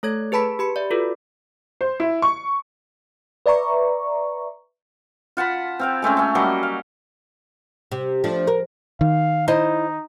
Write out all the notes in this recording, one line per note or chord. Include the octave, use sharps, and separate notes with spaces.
A3 A4 C#5 G#6
G#4 B4 A5 B5 B6
G4 B5 C#7
D5 E5
F4 F#4 A4 B4
C5
E4
C#6
B4 D5 E5 A#5 C#6
F4 F#5 A5 B5
C4 F5 G5
G#3 A3 C4 C#4
A3 C#4
F#3 G3 A#3 D#5
F5
C3
F3 A3 D4
A#4
D#3 F5
D#4 E4 C5 D#5